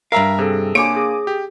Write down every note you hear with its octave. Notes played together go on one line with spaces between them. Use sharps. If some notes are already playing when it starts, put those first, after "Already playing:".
G2 A#4 E5 F5 A#5
C3 G#4 A4
A#3 D4 C#5 G#5 D6 D7
G#4
G4